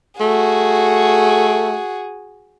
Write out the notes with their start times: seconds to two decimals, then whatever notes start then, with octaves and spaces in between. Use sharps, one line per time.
0.21 A3 F#4 G#4